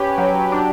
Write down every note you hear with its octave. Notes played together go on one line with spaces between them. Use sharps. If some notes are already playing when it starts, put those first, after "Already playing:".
Already playing: C#4 G4 B4
F#3
D4